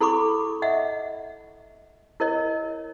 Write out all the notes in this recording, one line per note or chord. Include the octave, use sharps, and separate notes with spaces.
E4 A4 B5 C#6 D6
D#5 E5 F#5
E4 A#4 C#5 D#5